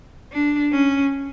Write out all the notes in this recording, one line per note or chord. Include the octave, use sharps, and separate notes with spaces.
D4
C#4